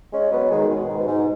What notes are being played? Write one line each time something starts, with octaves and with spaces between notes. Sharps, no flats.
G#3 C#4
F#3 B3
D#3 G#3
B2
G#2
B2
G#2